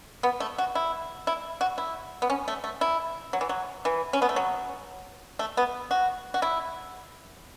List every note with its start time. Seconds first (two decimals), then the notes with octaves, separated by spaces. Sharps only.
0.23 B3
0.40 A3
0.58 F#4
0.75 E4
1.27 E4
1.61 F#4
1.78 E4
2.22 B3
2.30 C#4
2.48 A3
2.64 A3
2.81 E4
3.33 F#3
3.41 E3
3.49 F#3
3.85 E3
4.13 C#4
4.22 B3
4.29 A3
4.36 F#3
5.39 A3
5.57 B3
5.91 F#4
6.34 F#4
6.42 E4